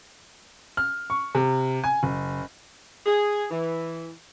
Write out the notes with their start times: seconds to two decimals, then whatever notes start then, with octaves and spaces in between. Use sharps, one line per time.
0.77 F6
1.10 C#6
1.35 C3
1.84 G#5
2.03 F#1
3.06 G#4
3.51 E3